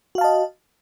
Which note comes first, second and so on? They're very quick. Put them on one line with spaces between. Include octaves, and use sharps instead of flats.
F#4 F5 A5 D#5